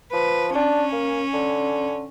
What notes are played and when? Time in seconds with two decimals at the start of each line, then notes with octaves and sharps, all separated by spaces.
0.13 F3 B4
0.56 C#4 D4
0.92 A#3
1.33 D3